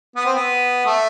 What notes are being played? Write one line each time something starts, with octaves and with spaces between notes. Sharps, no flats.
B3
C4
B3
A3